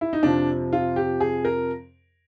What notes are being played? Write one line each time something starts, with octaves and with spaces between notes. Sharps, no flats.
E4
D#4
F2 C3 F3 D4
F4
G4
G#4
A#4